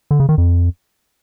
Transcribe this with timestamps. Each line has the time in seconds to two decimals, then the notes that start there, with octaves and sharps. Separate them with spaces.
0.11 D3
0.20 C#3
0.29 D#3
0.38 F2